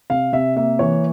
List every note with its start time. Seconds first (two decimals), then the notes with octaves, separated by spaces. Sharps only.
0.10 C3 F5
0.33 C3 E5
0.56 A#3 E5
0.79 E3 C#5